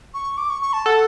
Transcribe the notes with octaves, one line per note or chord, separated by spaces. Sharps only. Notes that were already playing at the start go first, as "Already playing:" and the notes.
C#6
D6
C#6
C#6
A5
A4 F#5